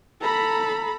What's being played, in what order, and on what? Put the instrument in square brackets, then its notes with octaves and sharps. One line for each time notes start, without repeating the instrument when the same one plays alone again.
[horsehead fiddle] A4 [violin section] A#5 B5